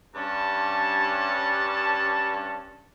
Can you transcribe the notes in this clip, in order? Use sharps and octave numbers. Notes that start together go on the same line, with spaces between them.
G2 C#4 A5